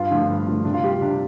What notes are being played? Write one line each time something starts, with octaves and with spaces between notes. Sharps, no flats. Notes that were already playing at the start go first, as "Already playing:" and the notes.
Already playing: G2 F4
D3 F3 A3
G2
D3 F3 A3
C3 D4
F4
G3 G4
F4
C3 D4